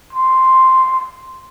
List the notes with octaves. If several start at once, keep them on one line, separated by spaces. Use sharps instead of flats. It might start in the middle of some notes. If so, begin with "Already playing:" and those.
C6